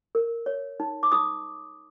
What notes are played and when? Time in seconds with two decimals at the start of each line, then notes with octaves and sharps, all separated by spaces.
0.15 A#4
0.46 C#5
0.80 D#4
1.03 D6
1.12 D#4 D#6